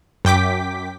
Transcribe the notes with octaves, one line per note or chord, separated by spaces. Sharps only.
F#2 G5 D6 B6